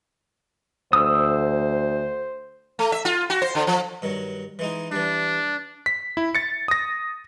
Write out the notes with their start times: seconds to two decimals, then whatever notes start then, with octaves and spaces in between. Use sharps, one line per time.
0.93 D2 C5 D#6 E6
2.79 A3
2.92 E5
3.05 F4
3.30 F#4
3.42 C5
3.55 D3
3.67 F3
4.02 G2 D#3 F#3
4.59 E3 G#3 D#4
4.92 E3 G3 D4
5.86 B6
6.17 E4
6.35 A6 C#7
6.68 D#6 A#6